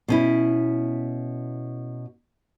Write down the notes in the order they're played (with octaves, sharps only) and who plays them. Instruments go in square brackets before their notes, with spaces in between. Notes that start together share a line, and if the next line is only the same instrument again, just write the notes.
[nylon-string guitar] B2 C#4 E4